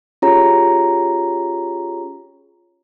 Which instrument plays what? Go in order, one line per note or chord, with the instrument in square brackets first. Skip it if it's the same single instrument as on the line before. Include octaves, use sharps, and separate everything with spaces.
[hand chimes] C#4 F4 G4 G#4 C#5 A#5